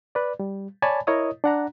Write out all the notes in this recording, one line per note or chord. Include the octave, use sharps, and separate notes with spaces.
B4 D5
G3
C#5 D5 G#5 A5 B5
E4 A#4 C#5 D#5 D#6
D4 F#5 A#5